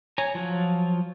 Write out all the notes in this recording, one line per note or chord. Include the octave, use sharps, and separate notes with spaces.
C#5 G#5 A#5
F3 F#3 F4